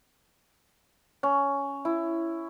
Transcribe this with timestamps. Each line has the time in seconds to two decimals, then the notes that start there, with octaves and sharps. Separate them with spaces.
1.23 C#4
1.85 E4